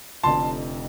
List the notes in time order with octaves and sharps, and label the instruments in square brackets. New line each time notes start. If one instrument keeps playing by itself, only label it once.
[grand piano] F1 F2 D3 F3 [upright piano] A5 C6